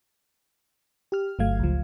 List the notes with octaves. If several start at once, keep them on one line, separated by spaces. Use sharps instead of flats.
G4 F6
G1 F#3 A3 F5 G#6
C#2 F3